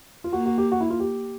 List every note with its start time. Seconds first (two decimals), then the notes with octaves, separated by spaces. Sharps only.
0.24 F4
0.33 A#3 F#4
0.46 F#4
0.58 G4
0.72 F#4
0.81 E4
0.90 F4
1.00 G4